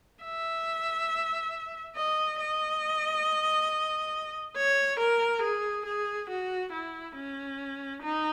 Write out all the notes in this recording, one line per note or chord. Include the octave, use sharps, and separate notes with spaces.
E5
D#5
D#5
C#5
A#4
G#4
G#4
F#4
E4
C#4
D#4